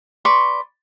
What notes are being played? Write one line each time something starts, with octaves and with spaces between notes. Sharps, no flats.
B4 D5 C6 C#6